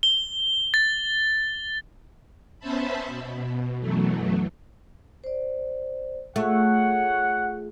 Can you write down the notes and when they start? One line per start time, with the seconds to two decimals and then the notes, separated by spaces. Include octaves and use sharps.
0.03 G7
0.74 A6
2.59 B3 C#4 C5 E5 A5 B5
3.06 B2
3.80 F#2 B2 E3 F#3 A3
5.24 C5 D5
6.36 A3 F4 G#4 C#5 F#5